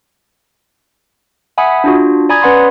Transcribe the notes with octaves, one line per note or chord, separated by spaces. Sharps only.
E5 F#5 G#5 B5 D#6
D4 F4 F#4
D5 G#5 A#5 B5 D#6 G#6
C#4 B4 D5 F#5 B5 C6